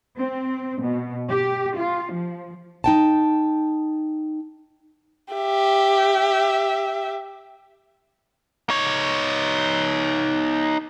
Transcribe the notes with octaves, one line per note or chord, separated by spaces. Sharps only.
C4
B2
G4
F4
F3
D#4 G5 A5
G4 E5
D#4 C#5